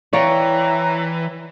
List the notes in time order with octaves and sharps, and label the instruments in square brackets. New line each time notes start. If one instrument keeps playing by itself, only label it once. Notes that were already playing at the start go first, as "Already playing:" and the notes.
[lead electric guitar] E3 [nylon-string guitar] C#5 [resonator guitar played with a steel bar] D5 F5 G5 [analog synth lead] A#5